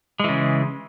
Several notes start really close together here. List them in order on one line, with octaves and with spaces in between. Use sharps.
G#3 E3 C#3